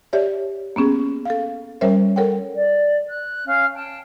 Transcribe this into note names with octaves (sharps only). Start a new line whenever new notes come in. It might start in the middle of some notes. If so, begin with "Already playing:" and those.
G4 C#5 D5 E5
A#3 B3 C#4 G#4
A4 F5
G3 C#4 A#4 C5 C#5 E5
A4 A#4 C#5 F#5 G5
D5
F#6
C#4 F5 F6
G5 A5